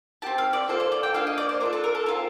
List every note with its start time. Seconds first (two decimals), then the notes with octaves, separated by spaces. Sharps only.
0.22 C4 G4 A5
0.38 F5
0.53 D5
0.68 A#3 F4 A4 C5
0.80 C5
0.92 D5
1.03 G5
1.14 A#3 D4 A4 F5
1.27 D#5
1.38 D5
1.49 C5
1.60 D4 F4 A4 A#4
1.73 A4
1.84 A#4
1.95 A4
2.06 C4 F4 A4 A#4